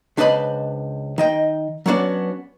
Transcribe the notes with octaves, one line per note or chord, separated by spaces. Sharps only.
C#2 D4 B4 C5 D#5 B5
D#3 D#5 G5
F#3 B3 C#4 D4 F#4